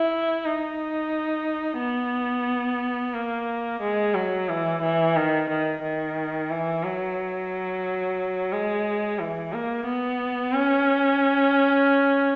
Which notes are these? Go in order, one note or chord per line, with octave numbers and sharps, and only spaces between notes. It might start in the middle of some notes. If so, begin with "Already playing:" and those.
Already playing: E4
D#4
B3
A#3
G#3
F#3
E3
E3
D#3
D#3
D#3
E3
F#3
G#3
E3
A#3
B3
C#4